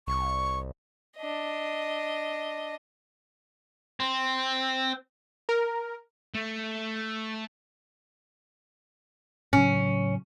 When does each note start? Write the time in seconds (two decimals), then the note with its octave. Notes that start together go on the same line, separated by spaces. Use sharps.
0.08 C2 C#6
1.18 D4 D#5
4.00 C4
5.49 A#4
6.34 A3
9.53 A2 C#3 F#3 C#4